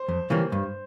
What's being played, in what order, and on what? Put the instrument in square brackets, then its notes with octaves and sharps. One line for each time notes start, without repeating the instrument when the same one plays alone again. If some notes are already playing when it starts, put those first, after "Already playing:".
Already playing: [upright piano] C5
[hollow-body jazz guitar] F2
C#3 E3 G3 A#3
G2